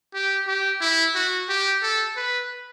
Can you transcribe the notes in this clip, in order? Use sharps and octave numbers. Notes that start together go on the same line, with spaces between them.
G4
G4
E4
F#4
G4
A4
B4